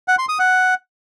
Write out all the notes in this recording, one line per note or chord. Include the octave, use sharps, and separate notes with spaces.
F#5
C6
D#6
F#5